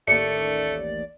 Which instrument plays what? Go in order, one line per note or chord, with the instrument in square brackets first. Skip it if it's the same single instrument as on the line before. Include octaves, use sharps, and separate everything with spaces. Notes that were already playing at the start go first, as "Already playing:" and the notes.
[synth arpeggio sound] A1 D#2 [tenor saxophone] A3 [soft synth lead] D5 [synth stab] C#7